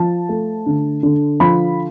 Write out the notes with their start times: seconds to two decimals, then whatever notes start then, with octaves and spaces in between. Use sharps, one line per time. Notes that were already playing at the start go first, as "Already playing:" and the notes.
Already playing: F3 A5
0.29 A3
0.66 D3
1.03 D3
1.40 F3 B5